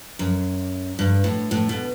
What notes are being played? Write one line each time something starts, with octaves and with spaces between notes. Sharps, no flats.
F#2
G2
A2
A2
B2